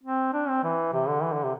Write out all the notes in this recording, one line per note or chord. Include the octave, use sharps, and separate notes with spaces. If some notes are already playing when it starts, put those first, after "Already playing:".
C4
D4
C4
E3
C3
D3
E3
D3
C3